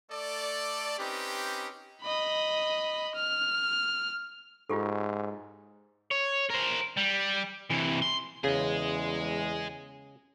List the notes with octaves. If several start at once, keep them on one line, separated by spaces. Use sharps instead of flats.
A3 A4 D5
C4 C#4 D#4 G4 B4
D#5 B5
F6
G#2 F4 G4 A4
C#5
A#4 C5
G3
C3 E3
C6
E2 C#3 G#4 D#5